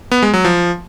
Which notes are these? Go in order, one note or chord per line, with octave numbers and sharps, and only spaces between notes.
B3
G#3
F#3
F3